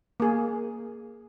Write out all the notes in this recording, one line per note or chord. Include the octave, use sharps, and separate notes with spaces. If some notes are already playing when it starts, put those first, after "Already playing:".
A#3 G#4